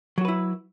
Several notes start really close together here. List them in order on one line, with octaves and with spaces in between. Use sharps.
F#3 F#4 B4 E4